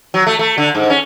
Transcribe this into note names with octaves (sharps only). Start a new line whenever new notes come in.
F#3
A3
A3
D3
G#2
C#4